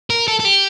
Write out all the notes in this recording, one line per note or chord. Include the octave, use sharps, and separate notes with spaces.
A#4
A4
A4
G4